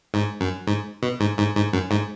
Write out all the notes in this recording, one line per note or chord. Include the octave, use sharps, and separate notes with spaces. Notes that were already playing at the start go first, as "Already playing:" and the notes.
G#2
F#2
G#2
B2
G#2
G#2
G#2
F#2
G#2